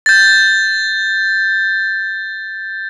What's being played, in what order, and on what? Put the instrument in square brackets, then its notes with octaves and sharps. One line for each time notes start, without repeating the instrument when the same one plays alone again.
[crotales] G6 A6